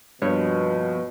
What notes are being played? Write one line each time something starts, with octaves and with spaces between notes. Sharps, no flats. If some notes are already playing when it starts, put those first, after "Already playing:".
G2 B2 F3 A#3 B3 C#5